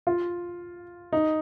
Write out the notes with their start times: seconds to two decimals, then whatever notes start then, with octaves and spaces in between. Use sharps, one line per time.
0.07 F4
1.13 D#4